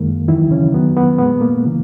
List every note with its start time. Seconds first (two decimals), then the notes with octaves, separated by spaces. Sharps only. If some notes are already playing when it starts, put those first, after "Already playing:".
Already playing: F#2 D#3 G#3 A#3 A#4
0.28 D#2 D#3 E3 F#3 E4
0.51 C#3 C#4
0.74 E2 D#3 F#3 B3
0.96 B3
1.18 A#2 G#3 B3
1.41 A#3
1.65 C#3 E3